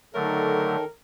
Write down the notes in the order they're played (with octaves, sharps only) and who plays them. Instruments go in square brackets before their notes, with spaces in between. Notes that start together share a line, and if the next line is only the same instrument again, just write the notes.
[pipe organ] D3 F#3 A3 [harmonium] D#3 A4 [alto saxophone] A#4